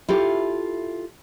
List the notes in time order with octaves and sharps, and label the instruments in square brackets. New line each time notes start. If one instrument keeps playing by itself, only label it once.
[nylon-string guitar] E4 F4 G4 A4